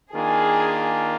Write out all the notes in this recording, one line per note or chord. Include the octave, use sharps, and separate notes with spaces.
D#3 A#3 D4 F4 G#4